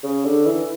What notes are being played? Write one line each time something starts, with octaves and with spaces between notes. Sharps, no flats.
C#3
D3
E3